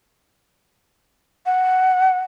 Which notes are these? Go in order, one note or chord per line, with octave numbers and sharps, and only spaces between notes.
F#5